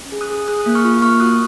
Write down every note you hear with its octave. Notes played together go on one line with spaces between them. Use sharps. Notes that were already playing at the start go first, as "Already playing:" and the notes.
Already playing: C#4
G#4
D#6 F#6
G#4
G#4 D#6 F#6
A#3 F#6
C#6 F6
F4
A#3 C#6 F6
F#4 D#6 F#6